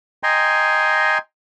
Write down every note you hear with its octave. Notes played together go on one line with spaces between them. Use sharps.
D#5 G5 G#5 A#5 C6